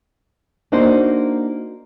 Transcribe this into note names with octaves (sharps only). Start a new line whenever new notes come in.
A#3 D4 D#4 F#4 C5